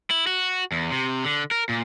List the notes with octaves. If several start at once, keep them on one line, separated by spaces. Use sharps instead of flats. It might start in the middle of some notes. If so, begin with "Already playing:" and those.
E4
F#4
E2
C3
D3
A#4
A#2